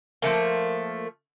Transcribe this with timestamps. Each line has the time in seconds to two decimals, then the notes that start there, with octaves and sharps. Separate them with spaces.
0.22 F3 A3 A#3